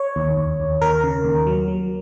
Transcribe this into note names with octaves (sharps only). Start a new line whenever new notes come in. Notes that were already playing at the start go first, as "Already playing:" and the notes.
Already playing: C#5
D#2
D#2
D#2
D#2 A#4
C#3
D#2
F#3
F#3